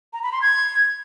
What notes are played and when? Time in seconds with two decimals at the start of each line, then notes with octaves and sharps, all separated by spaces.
0.13 A#5
0.23 B5
0.32 C6
0.42 G#6